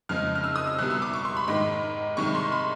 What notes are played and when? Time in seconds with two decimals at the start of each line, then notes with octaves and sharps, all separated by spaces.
0.09 F2 C#3 F3 G#3 F6
0.35 F6
0.44 E6
0.56 D#6
0.67 E6
0.78 C2 B2 G3 F#6
0.90 E6
1.02 D6
1.13 C#6
1.25 C6
1.37 B5
1.48 G#2 D#3 G#3 B5
2.17 C2 C3 D#3 G#3 C#6
2.35 C6
2.52 B5